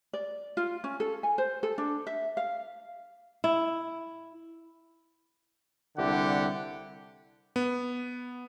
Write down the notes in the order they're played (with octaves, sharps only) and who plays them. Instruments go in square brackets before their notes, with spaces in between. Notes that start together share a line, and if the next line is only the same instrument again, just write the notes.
[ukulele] D5
F4
C#4
A4
G#5
C5
A4
D4
E5
F5
[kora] E4
[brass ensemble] C2 D3 E4 G4 F#5
[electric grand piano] B3